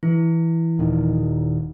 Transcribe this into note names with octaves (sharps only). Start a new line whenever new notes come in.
E3 E4
D#1 D#3